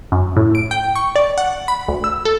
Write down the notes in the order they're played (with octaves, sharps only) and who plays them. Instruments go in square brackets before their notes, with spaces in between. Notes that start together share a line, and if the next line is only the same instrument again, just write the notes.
[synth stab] F#2
A2
D7
G5
C#6
D5
F#5
B5
D2
E6
A4